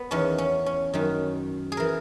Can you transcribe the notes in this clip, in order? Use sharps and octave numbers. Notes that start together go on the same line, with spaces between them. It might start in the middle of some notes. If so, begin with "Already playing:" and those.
Already playing: B3
E2 D#3 C#4
C#4
C#4
F#2 D#3
G#4
E3 A#4